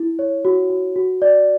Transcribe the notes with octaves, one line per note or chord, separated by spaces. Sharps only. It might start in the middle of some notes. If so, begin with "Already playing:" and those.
Already playing: E4
C#5
F#4
F#4
F#4
D5